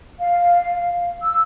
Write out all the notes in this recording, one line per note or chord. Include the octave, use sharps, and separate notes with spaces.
F5
E6